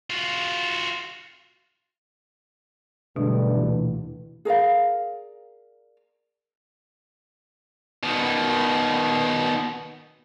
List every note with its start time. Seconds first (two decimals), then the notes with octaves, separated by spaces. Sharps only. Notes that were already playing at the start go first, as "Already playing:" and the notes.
0.10 F4 F#4
3.16 B1 G2 B2 D3 E3 G#3 A3
3.56 D2 A#2 D3 E3
4.45 G#4 A#4 D5 F5
8.03 B2 D#3